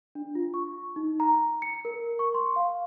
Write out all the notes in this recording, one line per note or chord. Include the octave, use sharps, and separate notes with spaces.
D4
F4
C#6
D#4
A#5
C#7
A#4
C#6
C6
F5